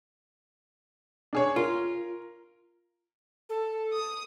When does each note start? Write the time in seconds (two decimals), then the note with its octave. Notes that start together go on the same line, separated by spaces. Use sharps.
1.33 D4 G#4 C#5
1.56 F4 A#4
3.49 A4
3.93 D#6